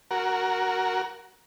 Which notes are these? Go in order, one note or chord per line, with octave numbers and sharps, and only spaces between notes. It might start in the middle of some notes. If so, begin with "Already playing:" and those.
F#4 A#4